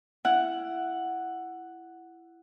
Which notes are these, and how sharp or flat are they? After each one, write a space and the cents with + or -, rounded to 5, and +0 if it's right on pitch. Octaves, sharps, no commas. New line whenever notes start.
E4 +20 F#5 +0